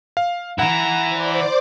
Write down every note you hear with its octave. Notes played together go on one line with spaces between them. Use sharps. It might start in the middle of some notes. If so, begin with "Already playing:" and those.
F5
E3 E4 F#5 A#5 E7
C5 D5 D6